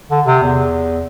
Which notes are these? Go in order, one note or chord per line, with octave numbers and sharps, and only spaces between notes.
D3
C3
E2